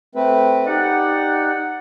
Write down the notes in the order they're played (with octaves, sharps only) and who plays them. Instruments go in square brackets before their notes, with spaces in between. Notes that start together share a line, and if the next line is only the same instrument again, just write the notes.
[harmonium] A3 C4 B4
[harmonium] D#4 [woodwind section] G4 D5 F#5